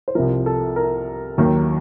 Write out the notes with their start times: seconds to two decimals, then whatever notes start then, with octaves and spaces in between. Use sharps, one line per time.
0.08 C5
0.15 C2 C3 F3 A#4
0.46 A4
0.76 A#4
1.38 D#2 D#3 F#3